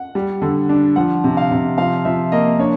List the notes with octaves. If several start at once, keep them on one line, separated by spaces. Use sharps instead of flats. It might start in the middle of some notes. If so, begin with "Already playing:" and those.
Already playing: F#5
G3
D3
D4
F3 F#5
C3
F5
C3
F3 F5
F3 E5
A#3 D#5
D4 C#5